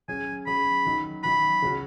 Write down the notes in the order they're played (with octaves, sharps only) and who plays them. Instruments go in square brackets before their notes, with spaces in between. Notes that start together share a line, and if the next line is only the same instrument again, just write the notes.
[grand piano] F#3 C#4 G#4 [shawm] G#5
[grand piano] F#3 C#4 G#4 [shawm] B5
[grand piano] D#3 F#3 D#4
[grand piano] D#3 F#3 D#4 [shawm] B5
[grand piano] C#3 F#3 C#4 F#4